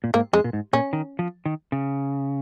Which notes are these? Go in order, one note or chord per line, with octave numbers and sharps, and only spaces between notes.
A#2
G#2 A#3
F2 G#3
A#2
G#2
A#2 C#4
D#3
F3
D#3
C#3